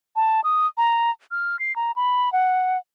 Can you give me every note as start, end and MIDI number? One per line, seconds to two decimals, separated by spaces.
0.16 0.41 81
0.44 0.67 87
0.77 1.11 82
1.31 1.59 89
1.59 1.75 96
1.76 1.92 82
1.96 2.32 83
2.33 2.78 78